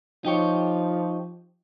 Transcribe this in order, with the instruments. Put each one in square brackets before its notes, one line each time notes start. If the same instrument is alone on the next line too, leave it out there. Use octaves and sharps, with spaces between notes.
[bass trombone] F3 [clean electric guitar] D#4 G4 C#5